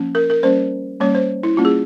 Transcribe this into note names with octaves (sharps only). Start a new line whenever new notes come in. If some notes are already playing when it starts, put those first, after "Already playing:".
Already playing: F3 A#3 C#4
A#4
A#4
G3 A#3 C#4 C5
G3 A#3 C#4 C#5
C5
E4
G3 A#3 C#4 F4
G#4